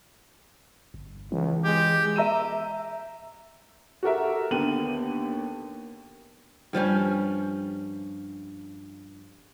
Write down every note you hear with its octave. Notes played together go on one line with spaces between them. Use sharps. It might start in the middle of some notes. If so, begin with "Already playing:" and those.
G1
C#2 E3
G#3 G4
E5 A#5 E6 D#7 E7
F#4 G4 A4 A#4 E5
D#2 D3 B3 G5 D#7 F#7
G2 F3 G3 C#4